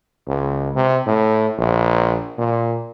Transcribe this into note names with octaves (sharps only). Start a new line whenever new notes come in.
C#2
C3
A2
A#1
A#2